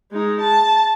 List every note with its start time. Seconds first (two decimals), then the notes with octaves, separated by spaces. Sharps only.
0.11 G#3 D#4
0.41 A5